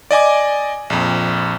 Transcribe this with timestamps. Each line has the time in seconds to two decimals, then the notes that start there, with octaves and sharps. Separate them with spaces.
0.11 D5 D#5 G#5 D6
0.90 A#1 F2